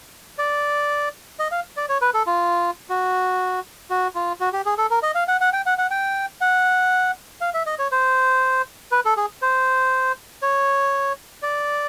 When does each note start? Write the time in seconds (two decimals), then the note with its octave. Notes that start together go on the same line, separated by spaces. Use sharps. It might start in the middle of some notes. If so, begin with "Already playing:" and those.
0.38 D5
1.39 D#5
1.52 F5
1.77 D5
1.89 C#5
2.01 B4
2.14 A4
2.27 F4
2.90 F#4
3.90 F#4
4.15 F4
4.40 F#4
4.53 G4
4.66 G#4
4.78 A4
4.90 A#4
5.03 D#5
5.15 F5
5.28 F#5
5.41 F#5
5.53 G5
5.66 F#5
5.78 F#5
5.91 G5
6.41 F#5
7.41 F5
7.54 E5
7.66 D#5
7.79 C#5
7.92 C5
8.91 B4
9.05 A4
9.17 G#4
9.42 C5
10.42 C#5
11.42 D5